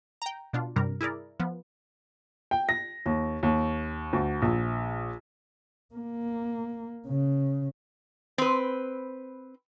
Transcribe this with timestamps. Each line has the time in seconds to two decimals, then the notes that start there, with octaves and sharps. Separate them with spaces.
0.22 G5 A#5
0.53 B2 D4 F4
0.76 G2 C3 G3 A#4
1.01 E4 G#4 A#4 D5
1.40 F3 B3
2.51 G5
2.69 A#6
3.06 D#2
3.43 D#2
4.13 D2
4.42 A#1
5.95 A#3
7.07 C#3
8.38 C4 B4